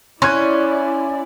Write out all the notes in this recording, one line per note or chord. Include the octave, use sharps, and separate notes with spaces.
C#4 E4 D5 C6 F#6 G#6